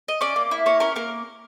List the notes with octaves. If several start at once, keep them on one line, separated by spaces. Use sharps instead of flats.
D#5
C#4 D5
A#3
E4
A#3 C#5
C#4 A#4
A#3 A#4